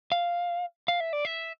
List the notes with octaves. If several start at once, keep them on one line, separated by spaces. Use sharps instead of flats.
F5
F5
E5
D5
E5